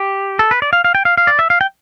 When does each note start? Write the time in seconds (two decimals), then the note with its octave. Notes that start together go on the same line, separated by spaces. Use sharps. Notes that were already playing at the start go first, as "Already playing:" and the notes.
Already playing: G4
0.39 A4
0.51 B4
0.62 D5
0.73 F5
0.84 F5
0.95 G5
1.05 F5
1.18 F5
1.27 D5
1.39 E5
1.50 F5
1.61 G5